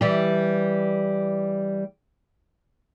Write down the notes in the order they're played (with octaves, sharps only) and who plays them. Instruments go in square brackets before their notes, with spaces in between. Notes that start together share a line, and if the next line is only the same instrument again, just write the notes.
[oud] E3 G3 G4